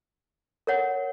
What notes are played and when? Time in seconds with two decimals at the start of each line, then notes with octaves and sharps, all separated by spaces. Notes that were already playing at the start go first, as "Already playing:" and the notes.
0.67 A#4 C#5 F#5